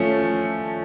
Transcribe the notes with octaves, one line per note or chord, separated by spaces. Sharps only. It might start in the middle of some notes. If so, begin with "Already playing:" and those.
Already playing: F3 A3 C#4